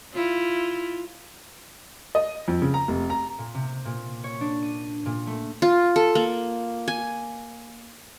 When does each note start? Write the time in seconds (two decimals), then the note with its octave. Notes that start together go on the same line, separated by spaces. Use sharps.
0.13 E4 F4
2.15 D#5
2.48 F2
2.62 C#3
2.74 A#5
2.88 F1
3.10 A#5
3.38 A#2
3.54 C3
3.85 A#2
4.24 C#5
4.41 D4
4.63 D#7
5.06 A#2
5.27 A3
5.62 F4
5.96 A4
6.15 A#3
6.88 G#5